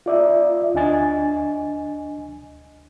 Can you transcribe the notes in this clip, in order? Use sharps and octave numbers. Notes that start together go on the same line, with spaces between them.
F4 D5 E5
D2 D4 D#5 G#5 A6